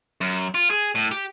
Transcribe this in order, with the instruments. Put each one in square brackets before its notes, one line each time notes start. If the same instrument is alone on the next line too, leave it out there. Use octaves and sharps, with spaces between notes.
[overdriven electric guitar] F#2
F4
G#4
A2
G4